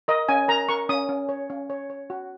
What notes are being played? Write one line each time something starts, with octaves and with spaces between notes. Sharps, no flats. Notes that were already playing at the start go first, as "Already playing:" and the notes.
A#4 D#5
C#4 G#5
A#4 A#5
A#4 C#6
C#4 D#6
C#4
C#5
C#4
C#5
C#5
F#4